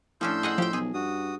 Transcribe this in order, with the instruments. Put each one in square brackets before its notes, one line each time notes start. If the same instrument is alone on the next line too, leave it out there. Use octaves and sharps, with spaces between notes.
[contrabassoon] A2 [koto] F3 C#4 D4 [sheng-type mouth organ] C6 E6 G6
[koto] G#4 D#5 F#5
[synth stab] F3 [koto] G4 G5
[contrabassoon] B1 [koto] G#4
[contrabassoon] G2 [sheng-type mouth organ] F#4 D#6